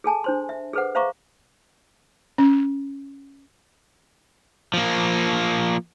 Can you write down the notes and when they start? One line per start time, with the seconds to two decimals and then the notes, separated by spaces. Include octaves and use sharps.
0.04 G#4 A4 G#5 A5
0.24 D4 C5 C6
0.49 E5
0.73 G#4 A4 B4 C5 F#5
0.95 C5 E5 F5 A#5 C#6 D6
2.38 C#4
4.74 F3 A#3